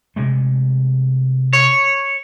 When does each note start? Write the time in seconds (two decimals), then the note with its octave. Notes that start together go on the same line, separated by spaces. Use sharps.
0.16 C3 G#3 A3
1.53 C#5